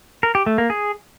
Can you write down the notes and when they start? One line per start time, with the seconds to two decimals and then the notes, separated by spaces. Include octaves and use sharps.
0.23 A#4
0.35 G4
0.46 A3
0.58 A#3
0.70 G#4